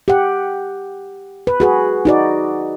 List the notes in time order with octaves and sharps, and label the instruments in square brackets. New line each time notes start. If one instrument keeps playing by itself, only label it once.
[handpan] G4 F#5
B4
F#4 G#4 B4
D#4 F#4 D5